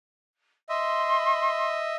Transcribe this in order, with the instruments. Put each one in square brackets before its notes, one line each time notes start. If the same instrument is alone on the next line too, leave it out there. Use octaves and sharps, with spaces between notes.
[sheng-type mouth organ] D#5 E5 [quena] C6